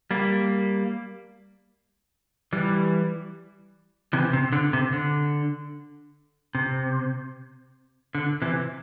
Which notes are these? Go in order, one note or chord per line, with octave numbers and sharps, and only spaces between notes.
G3 A#3
E3 G3
C3 E3
C3
D3
C3
D3
C3
D3
C3 E3